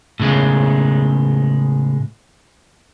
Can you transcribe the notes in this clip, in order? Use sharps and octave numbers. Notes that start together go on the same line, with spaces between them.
A2 C#3 G#3